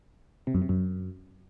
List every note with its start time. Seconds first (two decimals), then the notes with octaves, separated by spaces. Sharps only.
0.47 C3
0.54 F#2
0.62 C3
0.69 F#2